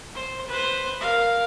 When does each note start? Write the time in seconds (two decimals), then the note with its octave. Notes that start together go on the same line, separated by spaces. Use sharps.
0.15 C5
0.48 B4 C5
1.01 A#4 F5